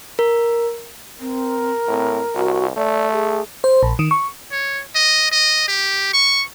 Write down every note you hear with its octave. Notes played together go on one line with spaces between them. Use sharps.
A#4
C4 A#4
A2 C4
C2 F#4
A3 D5
G#4
C5
A#1
D#3
C#6
C#5
D#5
D#5
G4
C#6